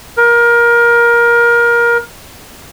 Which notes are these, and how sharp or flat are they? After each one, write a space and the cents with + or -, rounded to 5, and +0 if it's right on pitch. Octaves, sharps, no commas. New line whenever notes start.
A#4 +20